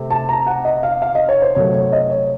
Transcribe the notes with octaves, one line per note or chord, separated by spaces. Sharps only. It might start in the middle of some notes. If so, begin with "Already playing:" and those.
Already playing: C3 A3
A5
A#5
F#5
D#5
F5
F5
D#5
C#5
C5
C3 F#3 A3 C#5
C#5
D#5
C#5